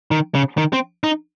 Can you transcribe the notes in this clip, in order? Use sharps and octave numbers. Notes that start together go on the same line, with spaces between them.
D#3
C#3
D#3
C4
D#4